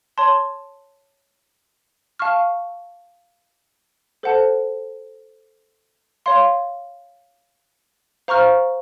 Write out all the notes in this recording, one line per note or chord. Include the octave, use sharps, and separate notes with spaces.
C#5 A5 C6
F5 A5 C#6 F6
A4 C5 F#5 A5
C#5 F5 C6
C5 F5 A#5 C#6 F6